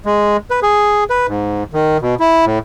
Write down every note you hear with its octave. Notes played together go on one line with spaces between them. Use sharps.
G#3
B4
G#4
B4
G#2
D#3
B2
E4
A2